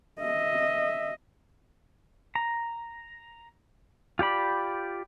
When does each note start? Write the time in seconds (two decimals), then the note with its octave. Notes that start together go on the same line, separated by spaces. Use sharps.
0.21 D#5 E5
2.35 A#5
4.19 F4 G4 D5 B5